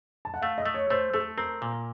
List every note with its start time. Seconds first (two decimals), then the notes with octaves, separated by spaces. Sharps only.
0.25 A5
0.34 F#5
0.42 A3 F5
0.58 D#5
0.66 A3
0.74 C#5
0.90 A3 C5
1.14 A3 A4
1.37 C4 A#4
1.62 A#2